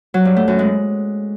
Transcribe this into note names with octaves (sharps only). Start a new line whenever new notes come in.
F#3
G2
A3
F#2
G#3